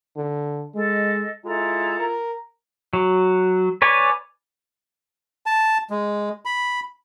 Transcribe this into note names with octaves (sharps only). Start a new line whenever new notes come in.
D3
G#3 A4 D#5
G#3 E4 F4 A4 A#5
A#4
F#3
B4 C#5 D5 G#5
A5
G#3
B5